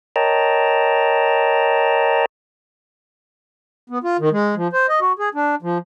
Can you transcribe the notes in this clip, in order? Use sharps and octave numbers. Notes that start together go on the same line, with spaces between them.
A#4 C#5 D#5 G5 A5 A#5
B3
F4
D#3
G#3
F3
C5
D#5
F#4
G#4
D4
F3